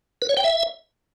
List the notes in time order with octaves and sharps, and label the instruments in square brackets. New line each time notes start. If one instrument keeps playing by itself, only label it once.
[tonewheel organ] B4
C#5
G5
E5